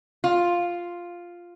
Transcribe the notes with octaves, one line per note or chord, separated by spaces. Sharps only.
F4